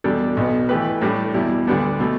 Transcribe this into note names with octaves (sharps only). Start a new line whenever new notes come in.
E2 B2 G3 D4 A4
B1 B2 B3
E3 A3 G4 B4
A2 G3 D4 G4
E2 B2 G3 E4
D2 D3 G3 B3 D4
B2 A3